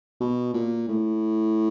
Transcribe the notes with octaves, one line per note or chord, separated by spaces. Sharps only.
B2
A#2
A2